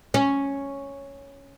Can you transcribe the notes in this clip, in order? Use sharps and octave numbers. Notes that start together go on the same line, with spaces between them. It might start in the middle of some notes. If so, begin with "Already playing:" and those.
C#4